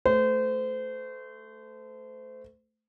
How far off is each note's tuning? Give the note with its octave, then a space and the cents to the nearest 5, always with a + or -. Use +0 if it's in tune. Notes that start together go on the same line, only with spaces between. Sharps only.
A3 +0 C5 -30